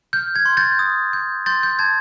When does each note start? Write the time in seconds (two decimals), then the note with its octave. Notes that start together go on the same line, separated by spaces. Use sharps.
0.13 F6 G6
0.36 G#6
0.46 C6
0.57 G6 A6
0.79 D#6
1.13 G6
1.46 C6 G6 A6
1.63 G6
1.79 A5 G#6